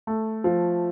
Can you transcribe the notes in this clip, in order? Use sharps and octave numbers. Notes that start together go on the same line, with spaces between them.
A3
F3